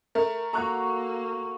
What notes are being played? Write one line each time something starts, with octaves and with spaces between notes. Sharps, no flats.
A3 A#4
A#3 F#4 A4 A#5 C#6 F#6